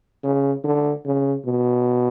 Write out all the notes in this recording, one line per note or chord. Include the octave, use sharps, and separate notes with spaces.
C#3
D3
C#3
B2